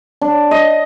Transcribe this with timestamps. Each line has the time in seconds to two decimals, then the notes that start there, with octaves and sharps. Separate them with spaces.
0.21 D4
0.51 D#5